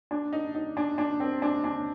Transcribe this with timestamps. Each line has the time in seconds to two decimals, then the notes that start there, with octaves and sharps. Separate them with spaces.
0.11 D4
0.33 D#4
0.55 D#4
0.77 D4
0.98 D4
1.20 C4
1.42 D4
1.64 D4